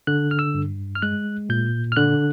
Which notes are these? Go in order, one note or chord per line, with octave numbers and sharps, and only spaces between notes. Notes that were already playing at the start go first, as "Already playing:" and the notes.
D3 F#6
F6
E6
G2
F6
G#3 F#6
A#2 G6
F6
D3 F#6